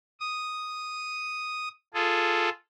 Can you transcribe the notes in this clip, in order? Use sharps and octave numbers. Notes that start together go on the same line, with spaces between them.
D#6
F4 G#4 A4